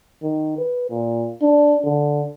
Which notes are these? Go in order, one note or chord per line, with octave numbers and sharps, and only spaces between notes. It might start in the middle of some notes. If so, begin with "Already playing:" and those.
D#3
B4
A#2
D4
D3